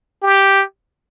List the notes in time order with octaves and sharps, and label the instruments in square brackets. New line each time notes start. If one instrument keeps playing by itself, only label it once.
[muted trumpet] G4